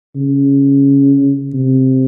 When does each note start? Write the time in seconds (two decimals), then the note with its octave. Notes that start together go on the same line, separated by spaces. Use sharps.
0.16 C#3
1.54 C3